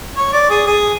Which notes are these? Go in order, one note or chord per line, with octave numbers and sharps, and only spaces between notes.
C#5
D5
G#4
G#4